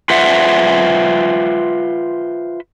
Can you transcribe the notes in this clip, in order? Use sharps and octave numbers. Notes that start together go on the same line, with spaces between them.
F4 B4 C5 E5 F#5